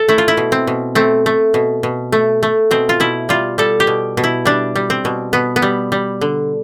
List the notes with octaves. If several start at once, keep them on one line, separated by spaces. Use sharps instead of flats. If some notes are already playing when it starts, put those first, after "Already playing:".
Already playing: A4
A3 E4
F4
E4
B2
C4
B2
A3 C4
A3
B2
B2
A3
A3
B2 C4
F4
B2 E4
G3 F4
G3 A4
G4
B2
B2
E4
G3 D4
G3
C4
B2
B2 B3
B3
G3
G3
D3